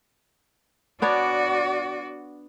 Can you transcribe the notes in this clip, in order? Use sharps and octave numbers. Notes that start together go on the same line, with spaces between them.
B3 D4 F#4 C#5 D5